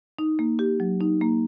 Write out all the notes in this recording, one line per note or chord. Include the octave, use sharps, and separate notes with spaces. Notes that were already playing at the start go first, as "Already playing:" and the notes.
D#4
A#3
G4
F#3
D#4
A#3